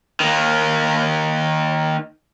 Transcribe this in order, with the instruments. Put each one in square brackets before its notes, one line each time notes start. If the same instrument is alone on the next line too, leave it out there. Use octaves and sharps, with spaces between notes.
[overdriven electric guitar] D#3 A#3